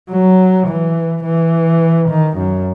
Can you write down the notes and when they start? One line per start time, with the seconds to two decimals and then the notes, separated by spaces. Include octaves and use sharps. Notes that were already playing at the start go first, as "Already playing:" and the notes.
0.10 F#3
0.67 E3
1.24 E3
2.09 D#3
2.38 F#2